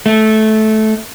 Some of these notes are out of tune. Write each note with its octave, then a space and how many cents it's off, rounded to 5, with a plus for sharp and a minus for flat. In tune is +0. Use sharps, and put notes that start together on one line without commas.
A3 -15